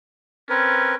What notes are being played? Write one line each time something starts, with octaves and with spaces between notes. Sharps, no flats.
C4 C#4 A#4 B4